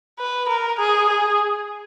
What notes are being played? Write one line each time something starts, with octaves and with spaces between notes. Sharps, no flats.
B4
A#4
G#4
G#4